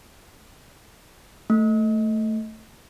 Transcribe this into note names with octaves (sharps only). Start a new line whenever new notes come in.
A3